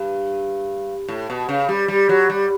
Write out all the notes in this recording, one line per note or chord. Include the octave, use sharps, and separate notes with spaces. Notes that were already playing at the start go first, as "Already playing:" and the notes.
Already playing: G2
A2
B2
C#3
G3
G3
F#3
G3